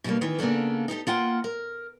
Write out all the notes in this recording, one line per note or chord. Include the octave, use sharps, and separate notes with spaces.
B2 D3 F#3 G3 A#3
D#3 E3
C#3 A#3 B3 D4 A4
D#4 E4 G4 A4
A#3 F4 F#5 G5
A#4